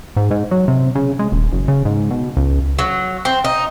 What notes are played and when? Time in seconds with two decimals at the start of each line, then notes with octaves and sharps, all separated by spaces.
0.16 G#2
0.31 G#2
0.51 F#3
0.68 C3
0.95 C#3
1.19 G#3
1.32 D#1
1.52 F#1
1.68 C#3
1.85 G#2
2.11 B2
2.37 C#2
2.79 F#3
3.25 C4
3.44 D#4